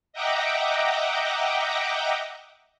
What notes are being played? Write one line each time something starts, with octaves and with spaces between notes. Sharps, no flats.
D#5 E5 F#5 G5 A#5 D6